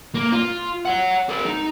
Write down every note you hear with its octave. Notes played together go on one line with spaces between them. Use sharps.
A#3
F4
C#5 F#5
G#4 A#4
D#4